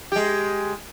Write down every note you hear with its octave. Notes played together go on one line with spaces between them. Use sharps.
G#3 G4